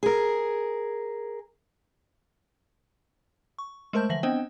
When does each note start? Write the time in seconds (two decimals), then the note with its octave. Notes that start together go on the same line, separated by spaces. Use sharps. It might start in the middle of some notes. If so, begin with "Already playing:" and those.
0.03 G#4 A#4
3.59 C#6
3.93 G#3 A3 A#4 C5 A5 G6
4.09 D3 E3 F3 E5 A#6 F#7
4.23 B3 C4 D4 C5 D#5 G5